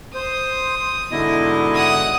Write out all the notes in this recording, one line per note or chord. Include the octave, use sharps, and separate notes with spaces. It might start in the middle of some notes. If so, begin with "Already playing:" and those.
C5 D#6
G#2 B2 D3 E4 D#5
F#5 D#6